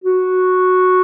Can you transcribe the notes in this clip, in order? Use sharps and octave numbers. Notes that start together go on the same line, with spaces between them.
F#4